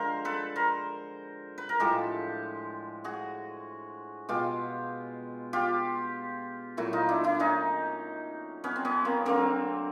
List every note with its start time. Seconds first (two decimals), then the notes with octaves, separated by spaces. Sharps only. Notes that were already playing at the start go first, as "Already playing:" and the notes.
Already playing: D3 F3 G#3 A#4 C5
0.25 A4 B4
0.56 A#4 C5
1.58 B4
1.69 A#4
1.80 A2 F3 G#3 G4 A4
3.04 F#4 G#4
4.29 B2 G#3 F4 G4
5.53 F4 G4
6.77 A#2 F#3 A3 E4 F#4
6.93 D#4 F4
7.09 D4 E4
7.24 D4 E4
7.39 C#4 D#4
8.64 B3 C#4
8.76 C4
8.85 B3 C#4
9.05 A#3 C4
9.25 D3 F#3 A3 A#3 C4